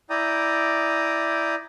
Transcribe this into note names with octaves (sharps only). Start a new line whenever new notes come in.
E4 D5 G5 A#5 D#6